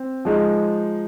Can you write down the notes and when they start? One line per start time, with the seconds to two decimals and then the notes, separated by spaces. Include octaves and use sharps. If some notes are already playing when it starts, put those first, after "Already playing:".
Already playing: C4
0.25 F3 G#3 D#4